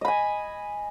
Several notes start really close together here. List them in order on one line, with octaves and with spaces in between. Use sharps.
D#5 B5 G#5